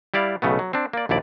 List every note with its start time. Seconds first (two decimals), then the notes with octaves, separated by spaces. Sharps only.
0.14 G3 E4 D5 F5
0.42 B1 C#3 A3 B3
0.59 F#3
0.73 C4 D4
0.93 A#3 D5
1.09 A#1 D#2 E4 D5